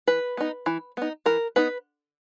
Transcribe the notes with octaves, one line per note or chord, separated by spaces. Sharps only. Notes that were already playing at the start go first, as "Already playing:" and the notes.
E3 B4
B3 D#4
E3
B3 D#4
E3 A#4
B3 D#4 B4